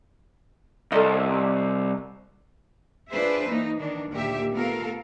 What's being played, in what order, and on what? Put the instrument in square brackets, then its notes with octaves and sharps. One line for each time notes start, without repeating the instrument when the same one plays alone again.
[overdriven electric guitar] C2 [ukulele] A4 D5 D#5
[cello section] D4 F4 G#4 B4 C5 E5
E3 A#3 D#4
D#3 E3 D4
D2 A#2 D#3 G4 E5
A3 B3 F4 A4 A#4 F5